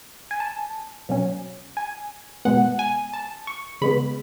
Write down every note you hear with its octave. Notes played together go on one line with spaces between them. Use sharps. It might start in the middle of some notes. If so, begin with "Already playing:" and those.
G#5
A5
B2 F#3 C#4
G#5
B2 G#3 B3 F#5
G#5
A5
C#6
C#3 G#3 B3 B5